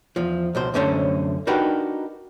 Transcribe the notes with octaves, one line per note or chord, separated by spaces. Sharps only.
E2 F3
C#2 B2 C5
C2 F#2 D3 A3 C#4 C5
D4 D#4 F#4 G4 A#4 B4